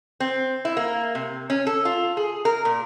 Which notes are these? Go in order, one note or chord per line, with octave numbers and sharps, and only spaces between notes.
C4
E4
A#3
C3
C#4
A4
F4
G#4
A#4
A#2